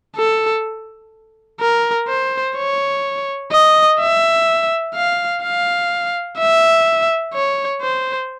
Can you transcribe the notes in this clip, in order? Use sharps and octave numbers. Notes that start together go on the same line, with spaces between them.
A4
A#4
C5
C#5
D#5
E5
F5
F5
E5
C#5
C5